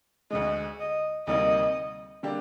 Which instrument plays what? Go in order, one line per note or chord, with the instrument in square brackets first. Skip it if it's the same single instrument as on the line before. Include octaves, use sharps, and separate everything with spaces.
[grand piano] D2 D3 G#3 [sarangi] D#5
[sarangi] D#5
[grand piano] D2 C3 G3 A#3 D#4 [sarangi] D#5
[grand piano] D3 G3 A#3 D4 G4